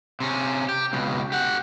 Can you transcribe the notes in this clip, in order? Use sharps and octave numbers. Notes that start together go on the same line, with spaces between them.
C3 C#4
G4
C#2 B2
G4 F#5